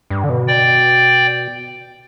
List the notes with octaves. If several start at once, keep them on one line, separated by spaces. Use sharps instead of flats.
G2
D3
B2
D5 G5